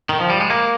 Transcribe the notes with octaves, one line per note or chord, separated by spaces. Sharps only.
D#3
F3
G3
G#3
A#3